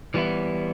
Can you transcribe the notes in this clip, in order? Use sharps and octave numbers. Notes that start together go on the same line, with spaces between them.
E3 G3 B3 E4